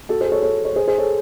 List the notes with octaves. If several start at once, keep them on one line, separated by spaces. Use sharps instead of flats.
F#4 A4
G#4 C5
A4 C#5
A4 C#5
C#5
G#4 C5
G#4 C5
A4 C#5